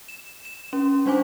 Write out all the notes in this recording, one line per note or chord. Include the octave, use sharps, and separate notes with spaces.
E7
E7
C#4
G3 D4 C5 G#5 D6